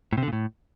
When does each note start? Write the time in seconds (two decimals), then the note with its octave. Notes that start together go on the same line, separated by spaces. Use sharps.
0.13 A2
0.18 C3
0.23 D3
0.28 A#2
0.33 A2